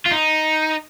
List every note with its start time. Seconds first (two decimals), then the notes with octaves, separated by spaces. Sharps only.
0.06 F4
0.11 D#4